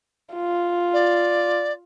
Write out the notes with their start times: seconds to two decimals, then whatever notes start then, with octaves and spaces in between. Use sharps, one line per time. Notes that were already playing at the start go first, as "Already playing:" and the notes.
0.35 F4
0.93 D5